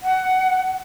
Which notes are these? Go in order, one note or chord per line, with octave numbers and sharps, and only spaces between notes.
F#5